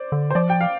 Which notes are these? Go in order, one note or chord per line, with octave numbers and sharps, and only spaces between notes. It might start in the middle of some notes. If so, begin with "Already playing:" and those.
Already playing: C5 D5
D3
C5
F3 D5
G5
F5